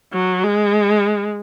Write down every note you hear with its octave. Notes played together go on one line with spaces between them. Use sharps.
F#3
G#3